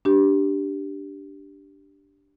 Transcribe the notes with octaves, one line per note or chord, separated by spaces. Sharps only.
D4 G4